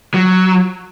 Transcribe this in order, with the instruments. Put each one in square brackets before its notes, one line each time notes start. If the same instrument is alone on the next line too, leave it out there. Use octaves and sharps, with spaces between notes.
[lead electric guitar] F#3